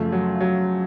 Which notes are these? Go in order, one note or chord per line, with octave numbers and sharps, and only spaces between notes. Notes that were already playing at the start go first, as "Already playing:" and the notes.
Already playing: F#2 C#3 F3 A3
F#3
F#3